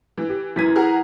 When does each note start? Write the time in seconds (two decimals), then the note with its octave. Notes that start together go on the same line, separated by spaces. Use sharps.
0.17 E3
0.29 G4
0.56 F#2 E3 G#6 B6 D#7
0.76 G#4 A#4 F#5